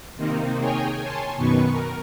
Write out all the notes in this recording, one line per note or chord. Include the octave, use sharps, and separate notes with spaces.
C3 D#3 A#3 C4 D#4
G#4 A#4 C#5 G5 G#5
C#5 G#5 A5 C6
F#2 B2 D#3 B3 B4 C#6
A#4